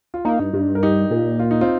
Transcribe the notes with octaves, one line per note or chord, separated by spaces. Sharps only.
F4
A#3 D#4
G2
G2
A#4
D#4 G4
A#2
F4
D#4
C4 F4